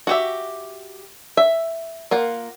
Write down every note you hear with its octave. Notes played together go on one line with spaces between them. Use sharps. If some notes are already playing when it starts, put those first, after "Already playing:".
F#4 G4 E5
E5
A#3 F4 F#5